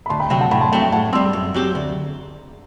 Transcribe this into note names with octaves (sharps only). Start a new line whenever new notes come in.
B5
D2 A5 C6
G5 B5
C3 F#3 C4 G5
F#5 A5
A2 G5 B5
A5 C6
F#3 A3 C4 G5
G5
A2 F#5 A5
G3 C4 C6 E6
F#2
F#3 C4 G4
D2